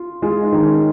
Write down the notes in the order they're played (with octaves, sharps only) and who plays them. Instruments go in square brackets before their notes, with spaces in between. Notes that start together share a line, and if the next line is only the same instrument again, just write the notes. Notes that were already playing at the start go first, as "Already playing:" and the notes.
Already playing: [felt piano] F4
[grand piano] G#3 [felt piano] F4
[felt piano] D#4
[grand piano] D#3
[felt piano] C#4